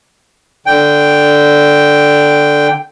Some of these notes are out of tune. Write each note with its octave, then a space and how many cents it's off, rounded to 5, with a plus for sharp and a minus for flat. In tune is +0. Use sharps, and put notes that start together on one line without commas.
D3 +0 G5 +0